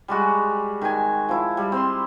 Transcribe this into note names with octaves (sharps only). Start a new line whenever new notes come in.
G3 G#3 F#4
D#3 G#5
F3 E4
G3
C4 C6